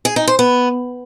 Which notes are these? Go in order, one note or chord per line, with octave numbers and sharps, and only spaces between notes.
G#4
D#4
C5
B3